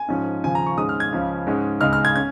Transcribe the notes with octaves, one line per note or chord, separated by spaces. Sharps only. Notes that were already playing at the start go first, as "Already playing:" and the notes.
Already playing: G#5
G#2 F3 C#4
D#2 C#3 F3 G#5
A#5
C#6
G#2 G#3 C#4 D#6
F6
G#6
C#2 C#3 F3 C#4
G#2 G#3 C#4
C#2 C#3 G#3 D#4 F6
F6
G#6
C#4 G#6